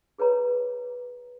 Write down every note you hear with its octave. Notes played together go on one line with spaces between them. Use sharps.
G#4 B4 C#5 A#5